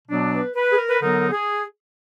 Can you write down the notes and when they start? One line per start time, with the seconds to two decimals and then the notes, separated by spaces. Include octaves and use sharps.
0.08 B2 F#3 B3 D4
0.33 B4
0.56 B4
0.72 G#4
0.78 A#4
0.90 B4
1.02 D3 F#3 B3 D#4 A#4
1.32 G#4